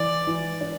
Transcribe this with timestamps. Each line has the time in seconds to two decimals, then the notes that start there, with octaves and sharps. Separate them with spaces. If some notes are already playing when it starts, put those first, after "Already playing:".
Already playing: E3 D5
0.27 E3
0.61 D4